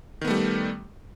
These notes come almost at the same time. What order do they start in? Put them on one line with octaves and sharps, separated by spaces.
D#3 B3 A3 G3